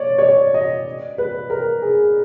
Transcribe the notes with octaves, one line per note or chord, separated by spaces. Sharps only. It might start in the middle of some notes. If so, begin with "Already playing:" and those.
Already playing: C#5 D5
C#5
D5
D#5
B4
A#4
G#4